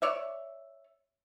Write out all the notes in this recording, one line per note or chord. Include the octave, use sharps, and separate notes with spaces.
C#5 D5 E5